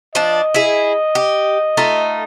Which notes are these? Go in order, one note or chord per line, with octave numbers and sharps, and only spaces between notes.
F3 D4 D#5
E4 G#4
G4
A3 D#4 F4